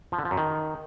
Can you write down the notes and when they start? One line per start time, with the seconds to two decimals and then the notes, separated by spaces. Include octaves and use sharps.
0.12 F3
0.19 D3
0.25 F3
0.31 F#2
0.37 D#3